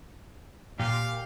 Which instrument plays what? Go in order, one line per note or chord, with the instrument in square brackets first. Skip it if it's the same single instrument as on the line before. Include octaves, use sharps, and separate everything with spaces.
[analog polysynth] A#2 [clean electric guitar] G4 [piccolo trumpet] F5